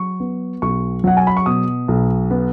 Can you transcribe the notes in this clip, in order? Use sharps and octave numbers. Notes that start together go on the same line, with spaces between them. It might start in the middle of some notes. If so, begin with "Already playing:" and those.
Already playing: F#3 C#6
B3
B1 C#6
F#3 F#5
G#5
B5
C#6
B2 D#6
B1
B3